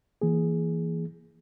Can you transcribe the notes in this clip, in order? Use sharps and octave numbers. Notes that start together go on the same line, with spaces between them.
E3 A#3 G#4